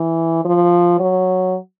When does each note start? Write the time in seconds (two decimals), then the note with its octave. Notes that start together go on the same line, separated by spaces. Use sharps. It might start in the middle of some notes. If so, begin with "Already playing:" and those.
Already playing: E3
0.45 F3
0.99 F#3